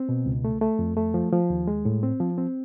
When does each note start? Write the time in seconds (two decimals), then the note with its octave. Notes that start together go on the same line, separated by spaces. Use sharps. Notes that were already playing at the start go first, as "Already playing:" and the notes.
Already playing: C4
0.09 B2
0.26 C#2
0.45 A3
0.61 A3
0.79 F2
0.97 A3
1.14 F3
1.32 F3
1.50 D#2
1.67 G#3
1.85 A2
2.03 C4
2.20 F3
2.38 C4